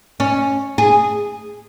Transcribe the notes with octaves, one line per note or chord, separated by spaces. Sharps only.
C#4
G#4